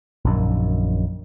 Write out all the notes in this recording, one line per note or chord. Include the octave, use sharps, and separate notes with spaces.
A#1 F#2 D#3